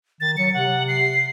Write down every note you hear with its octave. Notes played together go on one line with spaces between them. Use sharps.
D#3 A6
F#3 C#7
C3 F#5
C7